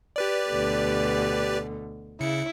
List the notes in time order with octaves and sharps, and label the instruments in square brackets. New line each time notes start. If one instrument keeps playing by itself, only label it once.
[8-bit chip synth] G4 B4 D5
[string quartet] D2 B2 D3
[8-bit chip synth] C#3 C#7 [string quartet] E4